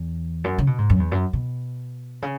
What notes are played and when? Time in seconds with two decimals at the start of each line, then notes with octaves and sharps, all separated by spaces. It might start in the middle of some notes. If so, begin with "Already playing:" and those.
Already playing: E2
0.44 F#2
0.58 C#3
0.67 B2
0.78 G#2
0.90 F#2
1.00 E2
1.12 F#2
1.33 B2
2.22 C#3